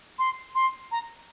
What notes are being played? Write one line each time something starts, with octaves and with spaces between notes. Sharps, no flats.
C6
C6
A#5